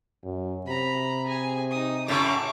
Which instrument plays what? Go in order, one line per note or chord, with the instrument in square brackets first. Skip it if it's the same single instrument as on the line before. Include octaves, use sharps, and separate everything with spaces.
[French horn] F#2
[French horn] C3 [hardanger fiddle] A#5 B5
[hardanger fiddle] G#4 G#5
D#4 D#6
[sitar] F#2 A2 C#3 [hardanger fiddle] C#6 D6